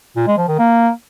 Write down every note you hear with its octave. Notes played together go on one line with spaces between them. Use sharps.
A#2
G#3
F3
D#3
A#3